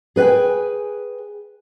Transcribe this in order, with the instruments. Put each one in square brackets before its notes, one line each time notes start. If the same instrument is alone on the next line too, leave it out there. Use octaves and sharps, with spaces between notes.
[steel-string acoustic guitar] G#4 B4 D5 G5 G#5